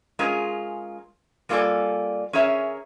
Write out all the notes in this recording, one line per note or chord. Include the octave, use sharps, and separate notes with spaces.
G#3 C#4 F4 G#4 A#4
G3 A#3 F4 A4 D5 G#5
C#4 G#4 A#4 C#5 E5